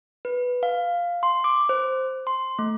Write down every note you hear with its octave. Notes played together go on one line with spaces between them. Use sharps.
B4
F5
C6
D6
C5
C6
A3